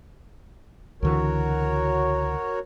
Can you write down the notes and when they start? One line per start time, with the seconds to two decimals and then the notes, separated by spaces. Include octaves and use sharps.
1.03 C#2 D3 E3 F#4 A#4 C#5